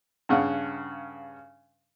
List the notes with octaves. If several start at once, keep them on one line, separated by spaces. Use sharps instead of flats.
G2 C#3 F#5